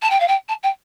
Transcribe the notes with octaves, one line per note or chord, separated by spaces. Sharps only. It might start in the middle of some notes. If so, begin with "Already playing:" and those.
A5
G5
F5
G5
A5
G5